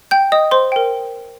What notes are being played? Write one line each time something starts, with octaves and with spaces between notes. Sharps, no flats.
G5 G6
D#5 D#6
C5 C6
A#4 G5